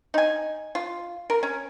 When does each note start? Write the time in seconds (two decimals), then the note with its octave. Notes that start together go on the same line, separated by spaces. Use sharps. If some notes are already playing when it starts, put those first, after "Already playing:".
0.14 D#4 G#5
0.75 F4
1.30 A#4
1.43 C#4